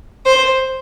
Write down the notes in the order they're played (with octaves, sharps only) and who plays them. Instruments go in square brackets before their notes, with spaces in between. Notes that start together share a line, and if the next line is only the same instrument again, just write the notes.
[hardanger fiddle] C5